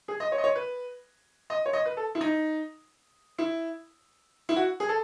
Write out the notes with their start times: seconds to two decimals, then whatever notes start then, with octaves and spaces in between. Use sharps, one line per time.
0.08 G#4
0.20 D#5
0.32 C#5
0.38 D#5
0.44 C#5
0.55 B4
1.50 D#5
1.65 C#5
1.73 D#5
1.85 B4
1.97 A4
2.15 E4
2.21 D#4
3.38 E4
4.49 E4
4.56 F#4
4.80 G#4
4.89 A4